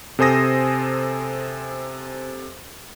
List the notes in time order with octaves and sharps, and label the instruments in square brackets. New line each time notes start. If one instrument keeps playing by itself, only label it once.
[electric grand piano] C3 A4 C5 G#5 D#6 A#6